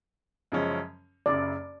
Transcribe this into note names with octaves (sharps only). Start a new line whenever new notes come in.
F#2 C#3 F3 G#3 C#4
F#1 F#2 C#3 D5